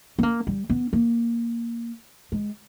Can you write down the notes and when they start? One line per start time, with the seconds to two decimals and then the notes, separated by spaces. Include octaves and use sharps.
0.19 B3
0.23 A#3
0.47 G3
0.70 B3
0.93 A#3
2.32 G#3